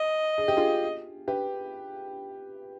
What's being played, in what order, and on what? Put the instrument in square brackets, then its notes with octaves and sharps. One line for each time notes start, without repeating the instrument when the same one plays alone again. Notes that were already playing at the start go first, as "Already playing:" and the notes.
Already playing: [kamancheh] D#5
[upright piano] G#4
G4
F4 G#4
G4 B4